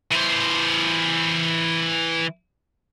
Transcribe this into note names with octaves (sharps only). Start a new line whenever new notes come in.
E3 C5